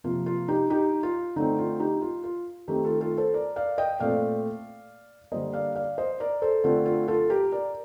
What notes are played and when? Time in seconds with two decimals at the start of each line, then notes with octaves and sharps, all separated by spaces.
0.04 C3 F3 A#3 F4
0.26 F4
0.48 D#4 G4
0.70 D#4 G4
1.03 F4
1.36 D3 A3 C4 D#4
1.58 F4
1.80 D#4 G4
2.02 F4
2.24 F4
2.68 D#3 A3 C4 D#4 G4
2.85 F4 A4
3.01 F4 A4
3.18 A4 C5
3.34 A#4 D5
3.56 D5 F5
3.78 D#5 G5
4.00 A#2 A3 C4 D5 F5
5.32 D3 G3 A#3 C5 D#5
5.53 D5 F5
5.76 D5 F5
5.98 C5 D#5
6.20 A#4 D5
6.42 A4 C5
6.64 D3 A3 C4 F4
6.86 F4
7.08 F4 A4
7.30 G4 A#4
7.52 A#4 D5